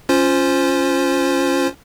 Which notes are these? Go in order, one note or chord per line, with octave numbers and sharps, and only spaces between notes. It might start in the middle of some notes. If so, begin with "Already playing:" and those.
C#4 F4 C5